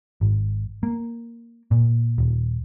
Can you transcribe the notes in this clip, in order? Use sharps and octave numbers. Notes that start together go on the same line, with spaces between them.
G#1
A#3
A#2
D#1